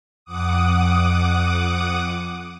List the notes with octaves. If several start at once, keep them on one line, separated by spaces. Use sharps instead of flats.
F2 F#5 D6 D#6